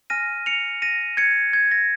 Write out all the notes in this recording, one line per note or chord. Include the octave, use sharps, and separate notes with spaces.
G#5 F6 A#6 D#7
C#7 F7
A#6 D#7
G#6 C#7
G#6
A#6